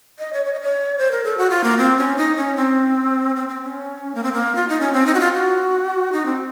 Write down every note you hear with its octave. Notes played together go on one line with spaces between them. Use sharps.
D#5
C#5
C#5
D#5
C#5
C5
A#4
A4
F#4
F4
A#3
C4
C#4
D#4
C#4
C4
C4
C4
C#4
A#3
C4
A#3
F4
D#4
C#4
C4
D#4
F#4
F4
F#4
D#4
C4